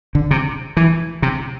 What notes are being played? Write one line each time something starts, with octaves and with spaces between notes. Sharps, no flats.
D3
C3
E3
C3